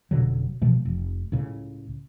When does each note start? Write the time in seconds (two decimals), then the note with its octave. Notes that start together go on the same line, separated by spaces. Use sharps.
0.11 F1 B2 D3 F#3
0.62 B2 E3 F3 A3
0.85 F1
1.32 C#2 A2 C#3